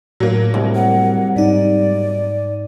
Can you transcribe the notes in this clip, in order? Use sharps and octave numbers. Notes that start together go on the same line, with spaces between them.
A2 F#3 A#3
C2
F#5
G#2 D#4 D5